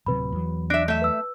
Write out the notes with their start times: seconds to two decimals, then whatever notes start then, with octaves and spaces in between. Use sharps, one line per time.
0.06 D1 C3 F#3 B4 B5
0.32 E2 F#3
0.70 D4 E5 F#6 A#6 D7
0.88 A3 E5
1.02 B4 E6